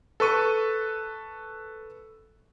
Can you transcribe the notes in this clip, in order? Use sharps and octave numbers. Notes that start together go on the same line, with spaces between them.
A4 B4 C#6 D#7